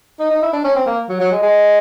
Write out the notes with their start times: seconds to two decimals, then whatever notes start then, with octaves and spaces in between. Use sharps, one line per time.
0.20 D#4
0.31 D#4
0.42 E4
0.53 D4
0.65 C#4
0.76 C4
0.87 A#3
1.09 F#3
1.20 F#3
1.32 G#3
1.43 G#3